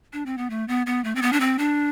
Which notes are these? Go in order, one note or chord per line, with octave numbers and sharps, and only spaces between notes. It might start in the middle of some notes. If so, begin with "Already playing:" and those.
D4
C4
B3
A3
B3
B3
A3
C4
B3
D4
C4
D4